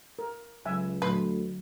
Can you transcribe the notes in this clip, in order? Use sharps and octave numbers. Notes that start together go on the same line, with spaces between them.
A#4
C#2 F#3 E5 G#5
D2 A#2 F#3 B4 C6